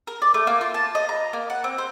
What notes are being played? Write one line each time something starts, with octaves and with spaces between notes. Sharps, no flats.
A#4
D5
A3
A#3
F4
A5
D#5
A#5
A#3
F#5
C4
C5